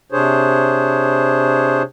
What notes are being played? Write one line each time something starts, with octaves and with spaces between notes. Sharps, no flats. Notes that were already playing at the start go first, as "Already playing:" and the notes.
C3 D4 G#4 C5 C#5